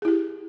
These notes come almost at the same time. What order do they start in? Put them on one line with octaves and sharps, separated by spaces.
G#4 E4 G4